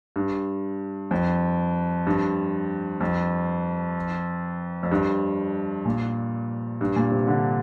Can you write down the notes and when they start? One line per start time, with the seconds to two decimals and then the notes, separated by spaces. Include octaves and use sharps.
0.16 G2
1.11 F2
2.07 G2
3.01 F2
4.83 F2
4.91 G2
5.85 A#2
6.81 G2
6.96 A#2
7.12 C3
7.27 D3